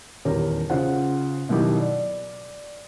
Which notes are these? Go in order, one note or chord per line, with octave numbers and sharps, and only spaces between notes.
D#1 E2 G4 A#4 C#5
C#3 F4 C5 F#5
B2 D#3 F#3 E4 G4
D5